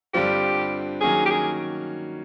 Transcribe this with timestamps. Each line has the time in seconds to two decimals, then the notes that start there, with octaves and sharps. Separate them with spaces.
0.14 G2 D3 G3 C4 F4 G4
1.01 D#3 F#3 A#3 C#4 G#4
1.26 G4
1.30 G#4